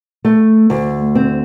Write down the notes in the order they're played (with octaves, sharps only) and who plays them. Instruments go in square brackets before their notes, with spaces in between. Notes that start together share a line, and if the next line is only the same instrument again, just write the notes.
[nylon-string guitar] A3
D2
C4